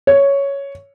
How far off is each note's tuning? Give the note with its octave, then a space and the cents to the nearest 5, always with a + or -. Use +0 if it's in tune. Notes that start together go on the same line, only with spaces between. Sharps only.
C#5 +5